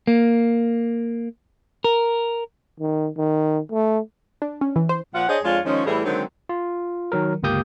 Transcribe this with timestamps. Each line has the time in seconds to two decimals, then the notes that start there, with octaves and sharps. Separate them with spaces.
0.07 A#3
1.84 A#4
2.80 D#3
3.17 D#3
3.71 A3
4.42 D4
4.61 C#4
4.76 E3
4.89 C5
5.15 A#2 F3 F4 F#5
5.28 D4 G#4 C5 C#5 D#5
5.44 F2 G#3 D4 F4 C#5
5.65 D#3 F3 G#3 C#4
5.85 A2 E3 G3 A3 E4 G#4
6.05 D3 D#3 F#3 G#3 C4
6.49 F4
7.12 D#3 F#3 A#4
7.43 G1 C#2 A#3 G4 D#6 G6